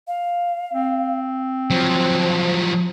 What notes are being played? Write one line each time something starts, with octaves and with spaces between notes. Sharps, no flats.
F5
C4
F3 F#3 C5